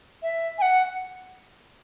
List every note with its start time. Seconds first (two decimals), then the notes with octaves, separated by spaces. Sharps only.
0.22 E5
0.58 G#5
0.62 F#5